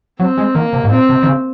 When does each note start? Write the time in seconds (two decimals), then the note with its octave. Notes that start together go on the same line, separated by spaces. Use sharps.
0.20 F#3 C4
0.38 G#3
0.55 D#3 A#3
0.73 C3
0.84 G#2
0.91 A#2 C4
1.09 C3
1.23 D#3
1.27 C#3